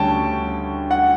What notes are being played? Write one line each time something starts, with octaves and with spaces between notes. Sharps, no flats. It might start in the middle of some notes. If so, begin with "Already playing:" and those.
Already playing: D2 C#3 G3 C#4 G5 A5
F#5